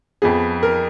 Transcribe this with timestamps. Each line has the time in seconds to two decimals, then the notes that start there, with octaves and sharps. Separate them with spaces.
0.22 F2 F3 B3 G#4
0.63 A#4